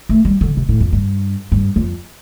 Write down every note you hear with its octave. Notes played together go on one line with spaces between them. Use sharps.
A3
G3
D3
C3
A2
F2
G2
G2
F2